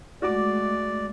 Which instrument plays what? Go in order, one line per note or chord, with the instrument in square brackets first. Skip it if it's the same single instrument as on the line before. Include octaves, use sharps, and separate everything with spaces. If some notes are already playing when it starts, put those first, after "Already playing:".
[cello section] G#3 A3 [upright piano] F#4 D6 [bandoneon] D5